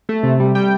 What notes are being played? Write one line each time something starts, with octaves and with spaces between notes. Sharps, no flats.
A3
C3
G3
G3 G5